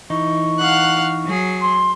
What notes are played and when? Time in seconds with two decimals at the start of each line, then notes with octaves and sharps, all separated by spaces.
0.10 E3 D#4 C#6
0.59 F5 F#5 F#6
1.25 F#3 G#4
1.61 C6